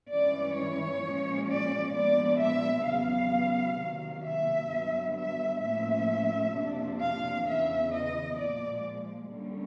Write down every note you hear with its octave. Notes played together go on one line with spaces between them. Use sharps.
G2 E3 G#3 C#4 D5
C#5
A#2 F3 G#3 C#4
D5
A#2 F3 G#3 B3 D4 D5
E5
E2 C#3 F#3 B3 F5
C3 D#3 F#3 A#3
E5
G2 D3 F#3 B3
E5
A2 F3 A#3 C#4 E5
F2 C3 F3 A#3 D4
F5
E2 C#3 E3 E5
D#5
A#2 F3 G#3 D5
D3 G3 A#3 C#4